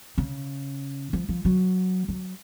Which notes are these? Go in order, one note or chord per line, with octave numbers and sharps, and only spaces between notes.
C#3
F3
F3
F#3
F#3